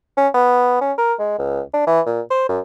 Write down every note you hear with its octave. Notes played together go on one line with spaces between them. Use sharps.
C#4
B3
C#4
A#4
G#3
C#2
D4
E3
A#2
C5
F#2